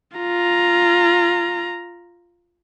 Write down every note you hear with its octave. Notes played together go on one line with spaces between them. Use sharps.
F4 A#5